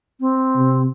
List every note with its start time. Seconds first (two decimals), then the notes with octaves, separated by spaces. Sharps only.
0.20 C4
0.55 C3